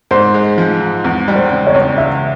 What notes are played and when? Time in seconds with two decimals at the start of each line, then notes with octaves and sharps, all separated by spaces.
0.11 G#2 C5
0.34 G#3
0.58 F3
0.80 G#2
1.05 E2
1.28 G3
1.36 C5
1.51 C#3
1.67 C#5
1.75 E2
1.98 C#2 E5